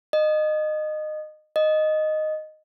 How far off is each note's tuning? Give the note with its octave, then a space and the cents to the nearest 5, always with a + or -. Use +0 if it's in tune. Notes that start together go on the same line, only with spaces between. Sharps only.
D#5 -20
D#5 -5